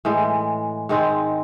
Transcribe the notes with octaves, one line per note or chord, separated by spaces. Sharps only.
A2 E3 G#3
G#2 D#3 G#3 C4